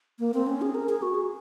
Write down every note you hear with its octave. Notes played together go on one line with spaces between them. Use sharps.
A#3
C4
C#4
G#4
A#4
G#4
F#4
G#4